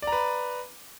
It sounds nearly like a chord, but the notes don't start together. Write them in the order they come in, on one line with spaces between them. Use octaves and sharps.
D5 A#5 B4